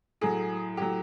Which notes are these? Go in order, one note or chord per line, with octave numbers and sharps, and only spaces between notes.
A2 F#3 G#4
A2 F#3 G4